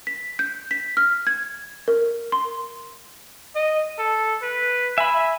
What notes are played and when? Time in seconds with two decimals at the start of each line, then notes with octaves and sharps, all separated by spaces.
0.07 B6
0.39 G6
0.71 B6
0.97 F6
1.27 G#6
1.88 A#4
2.32 C6
3.55 D#5
3.99 A4
4.43 B4
4.98 E5 G#5 B5